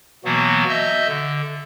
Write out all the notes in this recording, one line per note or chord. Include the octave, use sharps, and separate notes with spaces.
B2 E3 F#3 A#3 B3 F#4
D#5 E5 E6 G6
D3